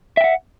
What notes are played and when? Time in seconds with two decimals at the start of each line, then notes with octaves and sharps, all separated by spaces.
0.17 E5
0.21 G5
0.24 F#5